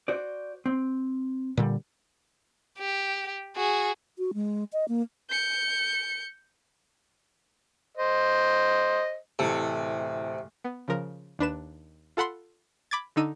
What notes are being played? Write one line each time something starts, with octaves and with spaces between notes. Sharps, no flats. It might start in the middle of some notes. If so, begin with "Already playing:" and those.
F#4 C5 D5
C4
A#2 D3 G3
G4
F#4 G#4
F#4
G#3
D#5
A#3
G6 C#7
C5 D#5
D1 C3 E3 A4
B3
C#3 F3 A#4
D#2 D4 B4 E7
F4 A4 F#5 B5 C6
B5 D6 G#6 A6
D3 D4 D#4 E6 D#7